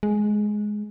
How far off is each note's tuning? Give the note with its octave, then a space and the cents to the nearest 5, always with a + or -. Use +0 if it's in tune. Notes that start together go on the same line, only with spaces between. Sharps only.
G#3 +10